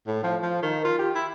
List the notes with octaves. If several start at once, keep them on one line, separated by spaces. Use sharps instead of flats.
A2
F3
F3
D#3
F4
G4
E4